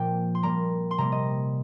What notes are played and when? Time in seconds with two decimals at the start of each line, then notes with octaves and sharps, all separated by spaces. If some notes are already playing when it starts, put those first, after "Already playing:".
Already playing: A#2 F3 A#3 C4 G5
0.35 C6
0.43 A#2 G3 A#3 A#5
0.91 C6
0.98 C3 G3 A#3 A#5
1.12 D#5